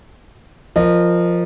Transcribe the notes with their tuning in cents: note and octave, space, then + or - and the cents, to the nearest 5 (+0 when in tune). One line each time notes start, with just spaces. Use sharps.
F3 +0 A#4 +0 D#5 -30